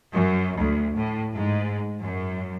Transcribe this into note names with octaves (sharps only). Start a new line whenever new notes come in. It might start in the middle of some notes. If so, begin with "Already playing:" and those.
F#2
D2
A2
G#2
F#2